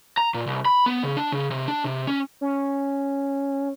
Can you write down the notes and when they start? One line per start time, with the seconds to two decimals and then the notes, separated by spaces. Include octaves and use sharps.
0.17 A#5
0.34 A#2
0.47 C2
0.65 B5
0.86 B3
1.03 C#3
1.17 D4
1.32 C#3
1.51 C3
1.68 D4
1.84 C3
2.07 C#4
2.41 C#4